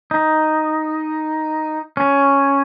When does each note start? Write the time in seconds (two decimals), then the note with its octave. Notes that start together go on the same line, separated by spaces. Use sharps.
0.11 D#4
1.97 C#4